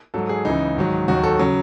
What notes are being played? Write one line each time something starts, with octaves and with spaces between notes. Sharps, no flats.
G#2 F#3 A4
G#4
C#2 C#3 E3 D#4
G#2 D#3 F#3
D#2 D#3 F#3 F#4
A4
C#3 F#3